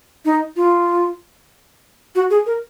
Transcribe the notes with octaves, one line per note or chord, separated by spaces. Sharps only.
D#4
F4
F#4
G#4
A#4